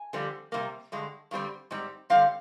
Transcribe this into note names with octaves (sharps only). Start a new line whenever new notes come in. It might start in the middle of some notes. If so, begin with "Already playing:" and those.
Already playing: G#5
F2 D3 G3 C4
C3 G3 A#3
G2 D3 G#3
G2 D3 G3 C4
G#2 G3 C4
D3 G3 C4 F5